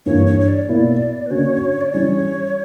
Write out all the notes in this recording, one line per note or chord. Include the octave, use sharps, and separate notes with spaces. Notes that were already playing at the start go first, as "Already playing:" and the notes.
G2 E3 G3 A#3 D4 C#5
C#5
C#5
D5
B2 A#3 E4
B4
D3 A#3 C#4 F#4 C#5
D5
E3 G3 C#4 E4 C#5